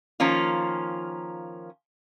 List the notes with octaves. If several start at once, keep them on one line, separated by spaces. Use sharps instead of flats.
D#3 F3 A#3 C#4 F4